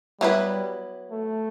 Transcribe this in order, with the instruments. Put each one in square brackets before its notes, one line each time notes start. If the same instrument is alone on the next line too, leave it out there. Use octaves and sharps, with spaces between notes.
[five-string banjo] F#3 B3 E4 G#4 B4 [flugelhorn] G3
[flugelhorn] A3